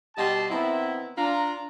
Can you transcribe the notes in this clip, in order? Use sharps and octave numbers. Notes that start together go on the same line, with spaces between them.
B2 G3 G4 D#5 A5 C6
D#3 B3 C4 E4
D4 F4 A#5